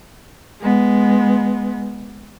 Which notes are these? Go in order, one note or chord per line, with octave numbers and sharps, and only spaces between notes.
G#3 B3